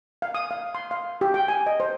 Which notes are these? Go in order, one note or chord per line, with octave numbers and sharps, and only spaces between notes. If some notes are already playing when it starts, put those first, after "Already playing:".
F5
D#6
F5
C6
F5
G4
G5
G#5
D#5
C5